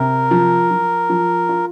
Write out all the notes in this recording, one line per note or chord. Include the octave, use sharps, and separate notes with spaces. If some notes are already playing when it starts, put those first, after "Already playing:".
Already playing: C3 A#4
F3
F3
F3
F4